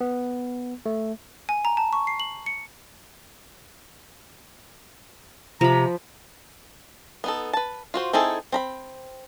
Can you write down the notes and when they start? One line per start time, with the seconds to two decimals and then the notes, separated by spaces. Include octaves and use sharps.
0.01 B3
0.86 A3
1.49 G#5
1.65 A#5
1.77 A5
1.93 C#6
2.07 C7
2.20 F#7
2.46 C#7
5.61 C3 F3 A#5 B5
7.24 B3 D#4 A4
7.53 B4 A5
7.94 F4 F#4 C5
8.13 C4 D#4 E4 G#4 A4
8.52 C4 A#5 B5